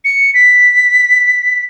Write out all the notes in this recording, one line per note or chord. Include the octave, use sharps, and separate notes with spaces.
C#7
B6